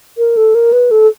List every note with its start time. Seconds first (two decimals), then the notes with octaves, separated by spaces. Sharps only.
0.18 A#4
0.37 A4
0.55 A#4
0.73 B4
0.91 A4